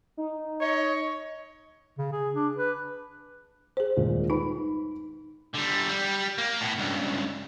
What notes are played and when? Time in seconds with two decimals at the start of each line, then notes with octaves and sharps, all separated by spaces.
0.17 D#4
0.60 C#5 D#5
1.98 C#3
2.12 G#4
2.34 D4
2.56 B4
3.77 G#4 C5
3.97 D#1 A#2 G#3
4.30 D#4 B4 B5
5.54 D3 G3
5.89 G3
6.38 A#3
6.61 A2 B3
6.79 C#2 G2